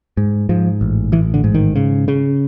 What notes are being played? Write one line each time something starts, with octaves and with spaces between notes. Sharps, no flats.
G#2
G#2 F3
A1
A1 E3
D3
G#2
D#3
C#3
C#3